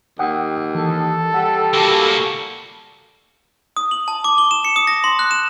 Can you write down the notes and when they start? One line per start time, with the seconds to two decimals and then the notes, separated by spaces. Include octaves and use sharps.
0.19 D#2 F#5 G5 D#6
0.75 E3 A4
1.34 G3 F#5
1.74 A#3 F#4
3.77 D#6
3.91 F#7
4.08 A5
4.24 D6
4.38 G7
4.51 E7
4.65 C#7
4.76 D#6
4.87 A#6
5.04 C6
5.19 F#6
5.31 E7